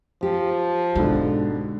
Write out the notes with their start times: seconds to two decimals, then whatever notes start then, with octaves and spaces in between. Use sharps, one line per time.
0.23 F3 G4
0.96 G#2 B2 D3 G#3